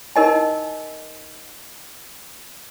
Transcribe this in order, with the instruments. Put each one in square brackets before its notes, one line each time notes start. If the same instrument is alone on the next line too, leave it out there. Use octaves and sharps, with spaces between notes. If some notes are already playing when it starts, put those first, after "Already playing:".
[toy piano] D#4 A#4 D#5 G#5